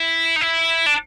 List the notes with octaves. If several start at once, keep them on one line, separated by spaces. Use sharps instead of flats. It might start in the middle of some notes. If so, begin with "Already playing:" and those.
Already playing: E4
D#4
E4
D4